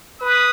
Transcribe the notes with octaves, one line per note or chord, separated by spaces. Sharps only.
B4 D#6